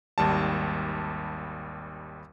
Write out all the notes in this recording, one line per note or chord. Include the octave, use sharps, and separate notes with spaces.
G#1 D#2 G3 A5